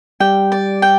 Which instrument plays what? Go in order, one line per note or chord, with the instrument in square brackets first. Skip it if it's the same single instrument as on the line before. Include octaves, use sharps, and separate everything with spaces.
[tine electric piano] G3 G4 [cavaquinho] G5
[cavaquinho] D5
G5